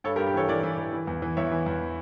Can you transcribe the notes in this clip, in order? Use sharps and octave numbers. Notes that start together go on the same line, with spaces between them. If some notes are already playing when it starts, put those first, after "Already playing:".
G2 A4 C#5
G4 A#4
G2
G4
E3 A4 C#5
E3 A#4 D5
E3
E3
E3
E2
E3
E2 C#5 E5
E3
E2